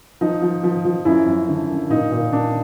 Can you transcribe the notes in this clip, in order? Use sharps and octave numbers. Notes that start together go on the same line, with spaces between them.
F3 D#4
F3
F3
F3
F#2 E4
F#2
D3
F#2
A#2 D#4
A#2
A#2 D4